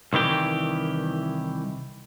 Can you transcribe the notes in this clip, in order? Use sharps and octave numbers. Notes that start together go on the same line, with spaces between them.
C2 D#3 E3 G4